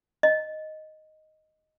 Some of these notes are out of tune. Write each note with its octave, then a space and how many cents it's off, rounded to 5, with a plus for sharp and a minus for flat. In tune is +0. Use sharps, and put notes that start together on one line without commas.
D#5 +0